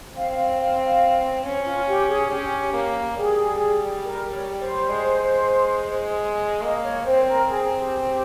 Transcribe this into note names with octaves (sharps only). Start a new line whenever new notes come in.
C4 F5
F5
C5
C#4 C#5
F4
G4
G#4
C#4 G4
A#3
G3 G#4
A#4
C#5
C5
G#3
A#3 D#5
C#5
C4 C5
A#4
G#4
G4
G4